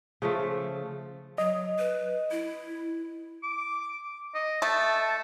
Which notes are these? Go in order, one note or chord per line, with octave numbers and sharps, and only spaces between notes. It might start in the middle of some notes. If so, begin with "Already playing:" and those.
C#3 F3 A3
F#3 D#5
B4
E4
D6
D#5
A3 A5